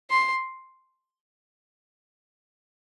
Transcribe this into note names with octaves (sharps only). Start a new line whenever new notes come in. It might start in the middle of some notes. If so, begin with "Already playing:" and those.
C6